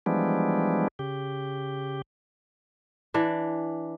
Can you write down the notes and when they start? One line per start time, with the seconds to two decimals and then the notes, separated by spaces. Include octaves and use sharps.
0.06 E3 F3 G3 G#3 B3 D4
0.99 C#3 G4
3.14 E3 D4